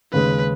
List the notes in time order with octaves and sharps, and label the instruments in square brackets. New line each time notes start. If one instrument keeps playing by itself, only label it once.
[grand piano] D#2 C#3 G#3 [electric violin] B4